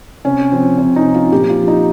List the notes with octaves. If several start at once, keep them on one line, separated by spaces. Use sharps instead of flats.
C3 C#4
F3 C4
C3 C#4
D#4
F3
F4
A#2 G4
F4
F3
D#4